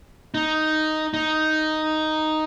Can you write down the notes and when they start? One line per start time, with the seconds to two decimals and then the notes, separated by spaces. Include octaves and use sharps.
0.34 D#4
1.14 D#4